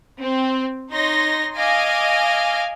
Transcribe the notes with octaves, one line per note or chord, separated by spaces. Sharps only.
C4
D#4 C#5 C6 A#6
D#5 F5 G#5 D6 A#6